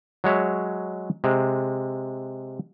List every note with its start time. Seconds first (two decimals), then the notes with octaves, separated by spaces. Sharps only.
0.24 F#3 G#3 C#5 E5
1.24 C3 G#3